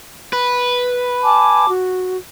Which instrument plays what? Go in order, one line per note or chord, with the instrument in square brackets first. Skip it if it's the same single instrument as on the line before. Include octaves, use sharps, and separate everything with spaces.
[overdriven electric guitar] B4
[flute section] G#5 A5 D6
F#4